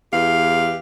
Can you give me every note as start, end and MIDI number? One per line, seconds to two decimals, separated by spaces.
0.12 0.79 40
0.12 0.79 52
0.12 0.79 67
0.12 0.79 77